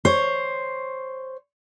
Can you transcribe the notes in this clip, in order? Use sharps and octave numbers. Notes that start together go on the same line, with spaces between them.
C5 C#5